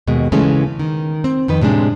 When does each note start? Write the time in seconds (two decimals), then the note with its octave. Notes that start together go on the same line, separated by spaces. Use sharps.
0.07 D#2 B2 G#3
0.32 C#3 E3 G#3 A3 C#4
0.79 D#3
1.24 C4
1.48 F2 D#3 B4
1.61 A2 C3 G#3 D4